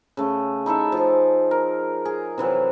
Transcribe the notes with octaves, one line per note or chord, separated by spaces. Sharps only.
C#3 A3
D#4 E4 A4 E5
F3 G#4
A#4
G#4
C3 E3 F#3